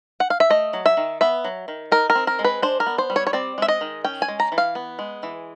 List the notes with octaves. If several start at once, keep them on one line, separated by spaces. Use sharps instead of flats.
F#5
F5
E5
A3 D#5
F#3
E5
D#3
B3 E5
F#3
D#3
D#4 A#4
A#4
C4
A#4
G#3
B4
D4 C5
A#4
B3
C5
G3
C#5
C#5
C4 D5
G#3 E5
D#5
D#3
C#4 G5
G#5
G#3
A#5
E3
F5
B3
G#3
E3